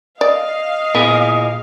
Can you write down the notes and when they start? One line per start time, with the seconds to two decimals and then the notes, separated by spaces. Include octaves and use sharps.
0.21 D5 D#5 F5
0.95 A#2 B3 E4 G#4